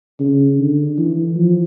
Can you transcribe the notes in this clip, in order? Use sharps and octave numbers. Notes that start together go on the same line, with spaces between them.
C#3
D3
E3
F3